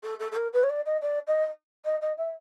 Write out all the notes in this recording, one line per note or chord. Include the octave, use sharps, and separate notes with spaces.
A4
A4
A4
A#4
B4
C#5
D5
D#5
D5
D#5
D#5
D#5
E5